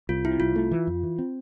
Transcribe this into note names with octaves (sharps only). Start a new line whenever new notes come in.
C2 F4
C3 E4
C2 F4
A3
E3
F2
E3
C4